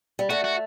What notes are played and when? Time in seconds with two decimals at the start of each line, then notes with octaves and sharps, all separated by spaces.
0.19 G3
0.30 A3 F#4
0.44 F#4